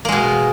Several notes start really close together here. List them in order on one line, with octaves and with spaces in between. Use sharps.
A#3 G#3 B2